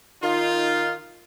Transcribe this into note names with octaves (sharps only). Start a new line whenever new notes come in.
D#3 D#4 F4